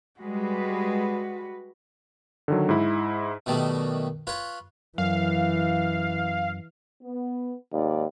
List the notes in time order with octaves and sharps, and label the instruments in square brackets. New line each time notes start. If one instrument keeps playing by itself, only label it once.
[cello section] G3 G#3 B4 [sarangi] F#4
[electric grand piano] D3 D#3 F#3
G#2 E4
[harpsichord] B2 D#3 F#3 G3 A3
F4 B4 C#5
[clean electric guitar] F#2 [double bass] E3 [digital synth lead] F5
[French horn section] B3
[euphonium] D#2 [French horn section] G#2 D5